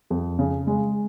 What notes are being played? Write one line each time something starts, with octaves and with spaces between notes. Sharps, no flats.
F2
C#3
G#3